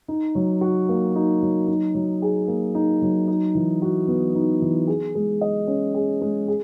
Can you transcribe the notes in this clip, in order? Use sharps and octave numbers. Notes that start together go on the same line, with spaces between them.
D#4
F#3
F#4
A#3
D#4
F#3
D#4
F#3
G#4
A#3
D#4
F#3
D#4
E3
F#4
B3
D#4
E3
G#4
G#3
D#5
C#4
G#4
G#3
G#4